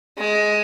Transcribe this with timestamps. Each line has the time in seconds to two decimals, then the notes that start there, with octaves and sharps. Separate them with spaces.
0.19 G#3